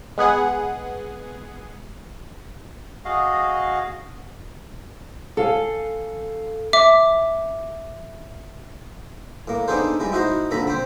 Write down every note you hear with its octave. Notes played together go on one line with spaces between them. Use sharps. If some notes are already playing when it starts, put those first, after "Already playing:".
G#3 B3 G#4 F#5
F#4 G#4 D#5 F5
A4 F5 G#5
E5 D6
A2 A#3
B3 D4 D#4 G#4 A4 C5
G3 G#3 E4
D#4 E4 F#4 C5 D#5
A#1 F2 D3 A4 A#5 B5
C4 C5